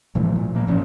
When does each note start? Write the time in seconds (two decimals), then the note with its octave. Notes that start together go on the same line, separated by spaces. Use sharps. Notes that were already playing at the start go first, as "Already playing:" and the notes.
0.15 A#2 E3 F3 A3
0.36 A#2
0.55 F3 A#3
0.67 G#1 A#2 C#4